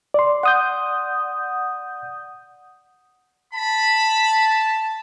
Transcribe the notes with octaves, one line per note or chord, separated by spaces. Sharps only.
D5 C6
F#5 D#6 G6
A5 B5